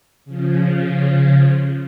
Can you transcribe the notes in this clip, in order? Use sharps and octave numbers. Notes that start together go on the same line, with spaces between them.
C#3 F3